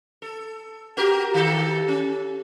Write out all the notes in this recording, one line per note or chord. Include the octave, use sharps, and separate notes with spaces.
A4
F#4 G4 A#4
D#3 G4 A4
C#4